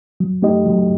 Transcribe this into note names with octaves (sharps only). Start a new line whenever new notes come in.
F#3
A3 D#4 G4 D#5
F#3